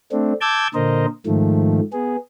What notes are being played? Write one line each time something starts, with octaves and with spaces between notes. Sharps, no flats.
A3 C4 D4
A5 D6 E6 G6 G#6
A#2 D3 A#4 C5 D#5
G#2 D#3 F3 A3
B3 G#4